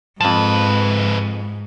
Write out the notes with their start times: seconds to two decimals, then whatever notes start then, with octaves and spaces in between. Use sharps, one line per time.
0.21 F2 G#2 F3 B4 A5